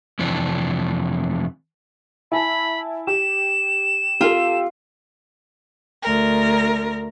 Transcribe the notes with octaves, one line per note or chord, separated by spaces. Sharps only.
F2 C3 E3 D4
E4 G#5 A5 B5
G4 E7
F4 G4 A4
D2 A#4